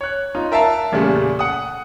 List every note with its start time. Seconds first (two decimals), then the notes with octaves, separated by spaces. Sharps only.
0.01 C#5 F#6
0.35 D#4 F4
0.52 A#4 E5 F5 A5
0.92 E2 A#2 C#3 G3 A3
1.39 F#5 D#6